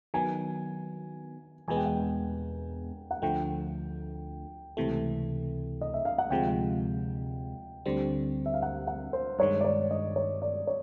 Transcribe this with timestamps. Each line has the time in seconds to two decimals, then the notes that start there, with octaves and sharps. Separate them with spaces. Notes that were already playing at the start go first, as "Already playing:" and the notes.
0.14 D#3 F#3 B3 G#5
1.68 E2 B2 G#3 B3 G#5
1.77 G5
1.86 F#5
1.95 G5
3.11 F#5
3.22 D2 D3 F3 A3 G5
4.77 C#2 C3 E3 A3
5.81 D#5
5.94 E5
6.05 F5
6.18 F#5
6.30 D2 C3 F3 G#3 G5
7.86 D2 D3 G3 C4
8.46 E5
8.54 F5
8.62 F#5
8.87 F#5
9.13 C5
9.39 G2 D#3 G#3 C#5
9.61 D5
9.64 C#5
9.91 D#5
10.16 C#5
10.42 D5
10.67 C#5